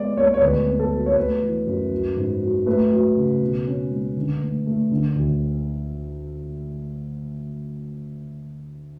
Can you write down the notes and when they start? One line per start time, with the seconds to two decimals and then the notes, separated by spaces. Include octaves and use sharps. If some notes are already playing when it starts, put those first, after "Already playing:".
Already playing: G#3 B3 D5
0.17 G#3 C#5
0.34 C#5
0.41 D2 B4
0.67 B3
0.79 A4
0.92 F#3
1.06 C#5
1.16 A3 B4
1.42 E3
1.67 F#2
1.92 F#3
2.17 G#2
2.42 F#3
2.66 A3 B4
2.91 F#3
3.16 C#3
3.42 B2
3.67 C#4
3.91 G#3
4.17 D3
4.41 A3
4.66 A3
4.91 D3
5.16 D2